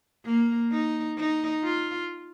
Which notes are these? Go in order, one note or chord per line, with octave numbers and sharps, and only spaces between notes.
A#3
D#4
D#4
F4